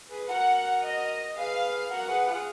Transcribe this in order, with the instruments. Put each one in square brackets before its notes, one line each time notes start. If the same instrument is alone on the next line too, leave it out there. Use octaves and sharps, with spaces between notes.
[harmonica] G#4 B4
[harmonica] F#4 A#4 [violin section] F#5
[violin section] D#5
[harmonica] G#4 B4 [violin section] F5
[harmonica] F#4 A#4 [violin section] F#5
[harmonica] G#4 B4
F4 G#4